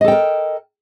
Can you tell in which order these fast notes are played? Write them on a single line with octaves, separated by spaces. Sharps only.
D#5 A4 G5 A#4